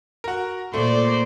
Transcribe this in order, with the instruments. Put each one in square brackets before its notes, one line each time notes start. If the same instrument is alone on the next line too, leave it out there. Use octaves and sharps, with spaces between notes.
[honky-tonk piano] F#4 A#4
[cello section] A#2 [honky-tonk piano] A3 [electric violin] C5 D5